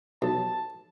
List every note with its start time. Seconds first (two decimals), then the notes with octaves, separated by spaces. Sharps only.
0.22 B1 A5